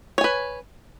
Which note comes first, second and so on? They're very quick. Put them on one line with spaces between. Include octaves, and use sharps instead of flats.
C#5 G#5 B4